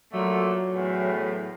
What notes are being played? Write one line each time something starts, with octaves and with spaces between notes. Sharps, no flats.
A#2 D3 F#3 A3
E2 A2